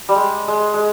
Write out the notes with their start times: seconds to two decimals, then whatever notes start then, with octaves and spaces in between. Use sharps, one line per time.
0.09 G3
0.16 G#3
0.48 G#3
0.74 G#3